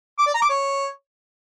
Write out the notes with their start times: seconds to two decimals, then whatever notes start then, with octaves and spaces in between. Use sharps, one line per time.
0.19 D6
0.26 D5
0.34 A#5
0.42 D6
0.50 C#5